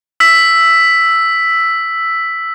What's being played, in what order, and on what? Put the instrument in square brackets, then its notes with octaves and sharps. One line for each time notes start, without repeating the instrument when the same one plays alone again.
[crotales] E6 B6